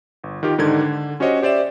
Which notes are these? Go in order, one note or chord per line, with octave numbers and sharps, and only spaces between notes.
G1
D#3 F4 G4
G#2 D3 D#3 G#6
D3
C#4 F#4 G4 C5 C#5 D#5
G4 C5 D5 E5 E7